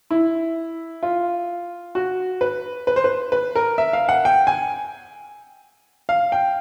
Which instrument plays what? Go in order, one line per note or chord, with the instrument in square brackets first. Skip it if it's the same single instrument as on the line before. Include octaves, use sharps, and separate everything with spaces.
[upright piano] E4
F4
F#4
B4
B4
C5
B4
B4
A#4
E5
F5
F#5
G5
G#5
F5
G5